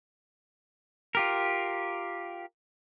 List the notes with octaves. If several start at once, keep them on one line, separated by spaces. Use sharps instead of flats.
F4 G4 A#4